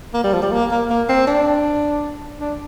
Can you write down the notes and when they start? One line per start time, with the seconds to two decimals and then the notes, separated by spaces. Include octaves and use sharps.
0.14 A#3
0.24 G3
0.33 F3
0.42 G3
0.51 A#3
0.71 A#3
0.90 A#3
1.09 C4
1.27 D4
2.40 D4